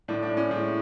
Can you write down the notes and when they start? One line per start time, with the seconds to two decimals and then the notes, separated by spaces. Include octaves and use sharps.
0.08 A2 D4
0.23 D4
0.29 A2
0.37 C#4
0.51 A2 G#3